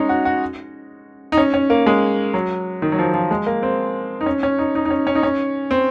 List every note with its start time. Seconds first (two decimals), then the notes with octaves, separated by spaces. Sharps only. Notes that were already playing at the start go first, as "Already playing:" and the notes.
Already playing: G#3 C#4 D#4
0.09 F#4
0.25 F#4
1.32 D#4
1.37 C#4
1.54 C#4
1.70 A#3
1.86 G#3
2.34 F#3
2.82 D#3
2.92 F#3
2.99 F3
3.14 F3
3.31 G#3
3.46 A#3
3.63 C4
4.21 D#4
4.26 C#4
4.43 C#4
4.59 D#4
4.75 D#4
4.85 D#4
4.90 C#4
5.07 C#4
5.15 D#4
5.23 C#4
5.71 C4